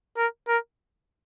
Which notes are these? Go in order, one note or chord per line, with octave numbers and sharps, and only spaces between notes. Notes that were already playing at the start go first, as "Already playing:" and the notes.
A#4
A#4